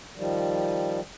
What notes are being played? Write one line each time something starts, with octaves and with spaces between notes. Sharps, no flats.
D#3 F3 G3